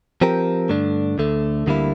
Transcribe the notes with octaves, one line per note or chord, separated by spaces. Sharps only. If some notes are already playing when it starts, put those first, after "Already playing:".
F3 C4 G4 A#4
G2 D3 A3 D4
D2 D3 A3
D2 D3 G3 A#3 E4